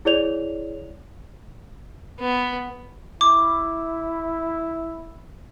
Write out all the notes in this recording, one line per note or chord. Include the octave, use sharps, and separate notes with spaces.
E4 G#4 C#5 D5 F7
B3
E4 D6